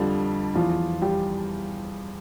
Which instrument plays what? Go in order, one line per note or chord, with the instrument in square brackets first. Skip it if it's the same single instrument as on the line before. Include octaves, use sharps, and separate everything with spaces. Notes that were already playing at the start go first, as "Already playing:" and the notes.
Already playing: [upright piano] F2 D3 F3 G3
E2 E3 F3 F4
G3 G4